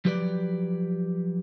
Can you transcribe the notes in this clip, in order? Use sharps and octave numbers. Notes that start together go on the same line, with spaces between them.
F3 F#3 G4 B4 C5 D5